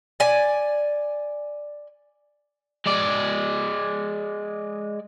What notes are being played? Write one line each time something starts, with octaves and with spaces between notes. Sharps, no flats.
D5 G#5
G#3 D5